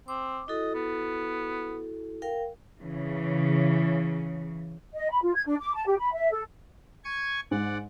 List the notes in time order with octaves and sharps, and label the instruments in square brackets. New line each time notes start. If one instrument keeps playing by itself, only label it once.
[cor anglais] C4 [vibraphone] D6
[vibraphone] E4 F#4 A4 [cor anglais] D#5
[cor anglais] B3
[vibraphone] A#4 F5 G5
[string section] C#3 E3
[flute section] D#5
B5
F4
G#6
D4
D6
A5
G4
B5
E5
A4
[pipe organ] G#5 C#6 G#6
[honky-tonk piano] G#2 [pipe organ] D5 F#5